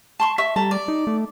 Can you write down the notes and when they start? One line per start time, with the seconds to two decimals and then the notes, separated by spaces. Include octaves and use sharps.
0.20 A5 C6 C#6
0.38 E5 C#6
0.56 G3 A4 A5 A#5
0.71 D5
0.88 D#4
1.07 A3